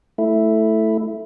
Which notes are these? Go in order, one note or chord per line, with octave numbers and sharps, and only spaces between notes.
A3 E4